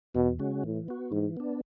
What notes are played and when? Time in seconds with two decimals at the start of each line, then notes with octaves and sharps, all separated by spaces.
0.15 E2 B2
0.39 C#3 G#3 C#4 F#4
0.64 A2 E3
0.88 B3 F#4
1.11 G#2 E3
1.37 B3 D4